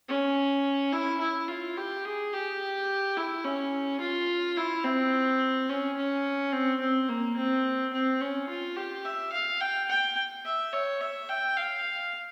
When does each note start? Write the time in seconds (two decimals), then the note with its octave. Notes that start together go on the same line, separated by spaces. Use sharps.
0.09 C#4
0.93 E4
1.21 E4
1.48 F4
1.77 G4
2.05 G#4
2.33 G4
3.17 E4
3.44 C#4
4.00 F4
4.57 E4
4.85 C4
5.69 C#4
5.97 C#4
6.53 C4
6.80 C4
7.09 A#3
7.37 C4
7.93 C4
8.20 C#4
8.49 F4
8.76 G4
9.05 E5
9.33 F5
9.61 G5
9.89 G5
10.45 E5
10.73 C#5
11.01 E5
11.29 G5
11.57 F5